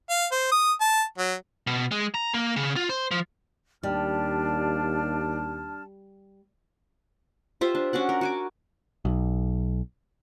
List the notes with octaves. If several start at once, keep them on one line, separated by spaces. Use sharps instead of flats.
F5
C5
D#6
A5
F#3
B2
G#3
A#5
A#3
C#3
F4
C5
F3
D#2 G3 D4 A5 F6
F4 G4 C5 E5
D4
C#4 D4 F#4 F#5
A#4
F#4 G#5 D6
B1